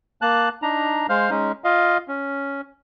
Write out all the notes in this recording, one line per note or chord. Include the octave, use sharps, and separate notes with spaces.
A#3 A5 F#6
D4 D#4 A#5
G#3 C5 F5 F6
G#3 C#4 D#4
F4 D#5 F5
C#4